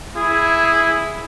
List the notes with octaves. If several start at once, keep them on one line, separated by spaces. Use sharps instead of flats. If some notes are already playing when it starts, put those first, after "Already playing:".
E4 G#4